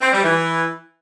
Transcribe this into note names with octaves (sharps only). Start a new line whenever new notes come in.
C4
G3
E3